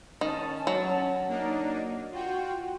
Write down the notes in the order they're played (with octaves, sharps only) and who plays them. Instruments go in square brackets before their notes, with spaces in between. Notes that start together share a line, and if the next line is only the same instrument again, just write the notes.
[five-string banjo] D#3 [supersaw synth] C#4 A5
[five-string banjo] F#3
[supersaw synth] A#3 D4 D#4
F4 F#4 G5